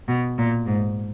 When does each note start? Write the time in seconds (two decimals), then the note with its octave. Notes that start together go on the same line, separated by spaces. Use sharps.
0.08 B2
0.38 A#2
0.67 G#2